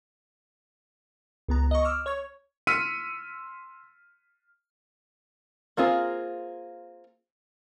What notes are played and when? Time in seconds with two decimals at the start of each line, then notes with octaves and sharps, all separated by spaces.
1.48 C#2 B3 A#5
1.71 D#5 C#6
1.85 D6 E6 F6
2.06 C#5 C#6 G#6
2.67 C6 E6 F6 B6 C#7 D#7
5.77 A#3 C4 F4 G#4 A#4